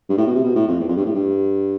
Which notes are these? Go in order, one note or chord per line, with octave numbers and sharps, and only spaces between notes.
G2
A2
B2
C3
B2
A2
F2
E2
F2
G2
A2
G2